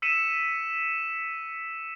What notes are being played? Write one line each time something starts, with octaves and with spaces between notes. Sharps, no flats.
E6 B6 C#7 D#7 E7